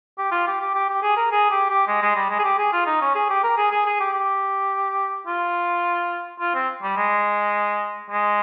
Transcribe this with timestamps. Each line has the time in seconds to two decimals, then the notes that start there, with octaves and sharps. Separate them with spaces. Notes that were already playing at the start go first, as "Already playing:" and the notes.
0.18 G4
0.32 F4
0.47 G4
0.60 G4
0.74 G4
0.89 G4
1.03 G#4
1.17 A#4
1.31 G#4
1.51 G4
1.70 G4
1.88 G#3
2.02 G#3
2.16 G3
2.30 G#3
2.39 G#4
2.44 G4
2.58 G#4
2.73 F4
2.86 D#4
3.02 C#4
3.15 G#4
3.30 G4
3.44 A#4
3.57 G#4
3.71 G#4
3.86 G#4
4.00 G4
4.14 G4
5.27 F4
6.40 F4
6.55 C4
6.83 G3
6.97 G#3
8.10 G#3